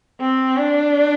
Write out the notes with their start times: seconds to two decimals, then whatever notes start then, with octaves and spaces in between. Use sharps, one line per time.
0.21 C4
0.57 D4